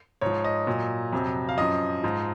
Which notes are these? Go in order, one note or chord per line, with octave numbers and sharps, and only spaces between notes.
G#2 F3 C#5
D#5
A#2 F#3
F2 C3 F#3
F5
F#2 F3 D#5
G#2 F3